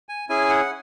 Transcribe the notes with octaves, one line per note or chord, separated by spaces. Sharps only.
G#5
C#4 E4 G#4 G#5
F#5